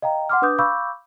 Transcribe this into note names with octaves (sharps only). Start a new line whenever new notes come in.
D#5 F5 G5 A#5
F#5 C6 D6 F6
D4 B4 D6 D#6 G6
F5 B5 C#6 D6 E6 G6